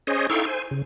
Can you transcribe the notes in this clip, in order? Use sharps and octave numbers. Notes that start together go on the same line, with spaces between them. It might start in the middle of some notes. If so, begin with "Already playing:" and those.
C#4 G#4 C5 C#5 D#5
D#4 E4 A4 F5 G5 C#6
C5 G#5
C#3